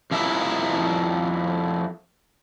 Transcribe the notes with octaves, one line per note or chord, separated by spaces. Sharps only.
F2 F3 E4 A#4 E5